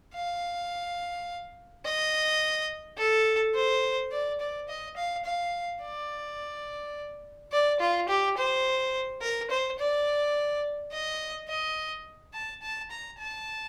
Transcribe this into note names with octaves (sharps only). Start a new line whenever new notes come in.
F5
D#5
A4
C5
D5
D5
D#5
F5
F5
D5
D5
F4
G4
C5
A#4
C5
D5
D#5
D#5
A5
A5
A#5
A5